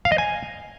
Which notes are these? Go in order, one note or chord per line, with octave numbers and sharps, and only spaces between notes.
F5
D#5
G#5